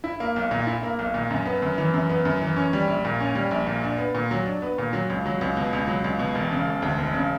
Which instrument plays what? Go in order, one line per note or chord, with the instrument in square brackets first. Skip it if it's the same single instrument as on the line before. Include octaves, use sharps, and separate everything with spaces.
[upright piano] E4
A#3
B1
A#2
E4
A#3
B1
A#2
F#2
B3
F#2
E3
F#2
B3
F#2
E3
C#4
G3
A#1
A#2
C#4
G3
A#1
A#2
D4
B3
A#2
F#3
D4
B3
A#2
F#3
C#2
F#3
C#2
B2
C#2
F#3
C#2
B2
E1
C#3
E1
D2
E1
C#3